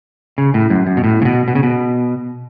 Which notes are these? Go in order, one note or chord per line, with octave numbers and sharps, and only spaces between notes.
C#3
A2
F#2
F#2
B2
A2
C#3
B2
B2
C#3
B2